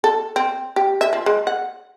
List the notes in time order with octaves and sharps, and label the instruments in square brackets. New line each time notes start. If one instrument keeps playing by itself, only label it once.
[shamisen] A4
C4
G4
E5
F3
G#3
F#5